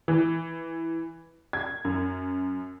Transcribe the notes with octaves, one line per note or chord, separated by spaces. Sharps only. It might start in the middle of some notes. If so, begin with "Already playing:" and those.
E3
G#6
F#2